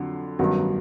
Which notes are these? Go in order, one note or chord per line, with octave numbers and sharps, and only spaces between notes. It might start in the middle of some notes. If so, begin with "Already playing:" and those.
Already playing: F2 D3 F#3
A1 G2 D#3 F#3 B3